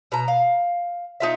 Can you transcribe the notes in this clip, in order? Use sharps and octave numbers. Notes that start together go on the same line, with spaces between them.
B2 A#5
F5
D#4 F4 E5